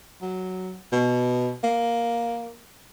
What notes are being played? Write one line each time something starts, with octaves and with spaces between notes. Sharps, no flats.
F#3
B2
A#3